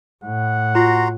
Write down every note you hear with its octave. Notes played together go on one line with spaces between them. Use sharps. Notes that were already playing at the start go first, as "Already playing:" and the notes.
A2 F#5
F4 F#4 A#5 C6